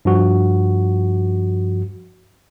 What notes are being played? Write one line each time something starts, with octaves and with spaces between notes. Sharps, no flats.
G2 F3 F#4